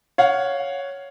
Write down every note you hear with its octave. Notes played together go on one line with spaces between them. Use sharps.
C#5 F5 F#5